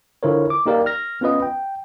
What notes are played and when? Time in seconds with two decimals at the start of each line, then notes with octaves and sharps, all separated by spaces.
0.23 D3 E4 F4 A#4 C5 C#5
0.50 D6
0.66 A#3 D#4 G4 A#4 D5 F5
0.86 F6 A#6
1.21 B3 C#4 F4 B4 D#5
1.42 G5